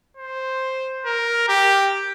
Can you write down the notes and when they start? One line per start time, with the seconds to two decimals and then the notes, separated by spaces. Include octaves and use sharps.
0.17 C5
1.06 A#4
1.48 G4